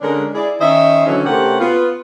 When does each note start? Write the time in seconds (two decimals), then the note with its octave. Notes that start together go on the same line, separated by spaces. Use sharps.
0.02 D3 G#3 C#4 D4 A#4
0.34 E4 G#4 D5
0.60 D#3 C#4 C5 D#5 E5
1.06 D3 E3 F#3 C#4
1.25 C3 A3 C#4 G4 A#4 F#5
1.60 B3 F4